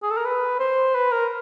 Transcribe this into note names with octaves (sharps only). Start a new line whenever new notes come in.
G#4
A4
A#4
B4
C5
B4
A#4